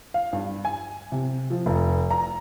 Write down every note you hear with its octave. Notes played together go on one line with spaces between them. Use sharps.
F5
G2
G#5
C3
F3
F1
A#5